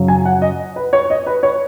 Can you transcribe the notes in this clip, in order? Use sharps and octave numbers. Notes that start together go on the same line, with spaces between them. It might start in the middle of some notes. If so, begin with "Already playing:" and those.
Already playing: F#2 C#3 F#3
G#5
F#5
D#5
B4
C#5
D#5
B4
C#5